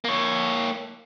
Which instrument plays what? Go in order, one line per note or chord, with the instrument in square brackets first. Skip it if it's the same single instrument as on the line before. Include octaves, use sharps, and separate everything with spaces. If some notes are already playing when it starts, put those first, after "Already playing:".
[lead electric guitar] A#3 C#5